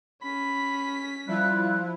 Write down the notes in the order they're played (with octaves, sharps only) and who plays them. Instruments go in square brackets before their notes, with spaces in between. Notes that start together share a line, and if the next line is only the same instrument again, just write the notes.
[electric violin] C#4 B6 [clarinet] B5
[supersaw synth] F3 E4 [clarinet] G3 [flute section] F4 F#6